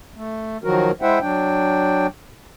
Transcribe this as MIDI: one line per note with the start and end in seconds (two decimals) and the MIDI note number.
0.16 0.57 57
0.64 0.91 51
0.64 0.91 53
0.64 0.91 54
0.64 0.91 66
0.64 0.91 70
1.02 1.19 56
1.02 1.19 64
1.02 1.19 72
1.02 1.19 76
1.02 1.19 78
1.02 1.19 79
1.21 2.07 54
1.21 2.07 62
1.21 2.07 79